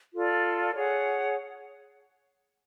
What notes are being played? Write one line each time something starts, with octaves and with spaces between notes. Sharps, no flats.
F4 A4 D5
G#4 C#5 F#5